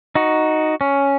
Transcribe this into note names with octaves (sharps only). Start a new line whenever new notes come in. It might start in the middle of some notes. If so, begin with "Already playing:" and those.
D#4 F#4
C#4